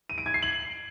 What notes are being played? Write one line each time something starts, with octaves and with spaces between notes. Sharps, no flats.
D#7
D7
G#6
C7
F#7